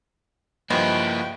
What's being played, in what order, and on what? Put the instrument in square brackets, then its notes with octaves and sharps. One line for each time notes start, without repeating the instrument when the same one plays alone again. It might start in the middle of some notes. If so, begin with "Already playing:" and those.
[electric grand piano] G2 F3 [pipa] G#3 B3 [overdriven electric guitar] A#3 E4 [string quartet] G5